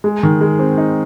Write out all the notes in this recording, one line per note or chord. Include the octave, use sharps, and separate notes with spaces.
G#3
D#3
G#3
C4
D#4